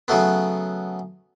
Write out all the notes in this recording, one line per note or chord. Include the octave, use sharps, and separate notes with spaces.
C#3 F#3 A3 B3